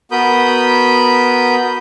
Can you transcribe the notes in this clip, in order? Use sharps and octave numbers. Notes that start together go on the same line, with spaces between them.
B3 F#4 A#4 B5 D#6 G6